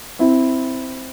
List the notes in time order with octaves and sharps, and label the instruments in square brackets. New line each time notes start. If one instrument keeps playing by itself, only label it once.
[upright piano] C4 E4